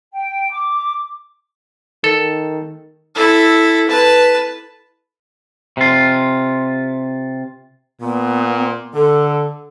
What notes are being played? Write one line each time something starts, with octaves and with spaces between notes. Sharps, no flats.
G5
D6
D#3 A4
E4 A4
B4 A5
C3 F4
A#2 B3
D3 A4